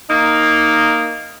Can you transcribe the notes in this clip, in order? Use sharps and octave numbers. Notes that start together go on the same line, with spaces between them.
A#3 D#4